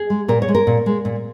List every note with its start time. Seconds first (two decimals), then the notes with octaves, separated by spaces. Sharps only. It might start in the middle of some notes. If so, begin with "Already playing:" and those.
Already playing: G#4
0.10 G#3
0.28 A#2 A#4
0.42 C#5
0.48 G#3
0.55 A#4
0.67 A#2
0.86 G#3
1.05 A#2